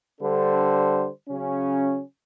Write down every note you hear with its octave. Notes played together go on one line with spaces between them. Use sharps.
D3 G3 D4 A4 C5
C#3 F#3 C#4